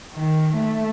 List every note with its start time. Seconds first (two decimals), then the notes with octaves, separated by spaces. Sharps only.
0.14 D#3
0.55 A3